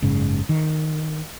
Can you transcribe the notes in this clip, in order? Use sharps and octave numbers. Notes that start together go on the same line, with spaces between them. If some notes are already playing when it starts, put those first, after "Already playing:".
F#1 G#2 C#3
D#3